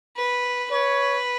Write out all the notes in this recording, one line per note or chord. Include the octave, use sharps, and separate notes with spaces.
B4
B4 C#5